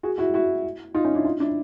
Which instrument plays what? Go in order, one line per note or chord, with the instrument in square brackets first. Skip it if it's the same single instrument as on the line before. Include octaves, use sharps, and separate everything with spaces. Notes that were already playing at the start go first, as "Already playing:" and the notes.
[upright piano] F#4 G#4
E4 F#4
E4 F#4
D#4 F4
C#4 D#4
D4 E4
D#4 F4
D4 E4